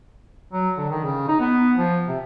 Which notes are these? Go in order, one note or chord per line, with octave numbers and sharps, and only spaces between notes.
F#3
D3
D#3
C#3
D#4
B3
F3
C3